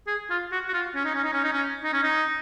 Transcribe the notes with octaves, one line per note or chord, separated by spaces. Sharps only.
G#4
F4
F#4
F#4
F4
C#4
D#4
C#4
D#4
C#4
D#4
C#4
D#4
C#4
D#4